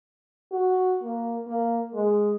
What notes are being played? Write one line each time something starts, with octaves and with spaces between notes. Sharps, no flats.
F#4
A#3
A#3
G#3